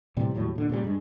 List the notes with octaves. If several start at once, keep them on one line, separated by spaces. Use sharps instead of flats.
A2 C3 E3 G3
D#2 A2 F#3 G3
A#2 D3
A#2 C#3 F3 G3
G2 G#3